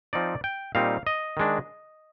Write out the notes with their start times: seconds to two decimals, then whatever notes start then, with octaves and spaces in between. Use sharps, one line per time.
0.13 F3 C4 D#4 D5
0.44 G5
0.75 A#2 G3 C4 D#4 F5
1.07 D#5
1.37 D#3 G#3 D4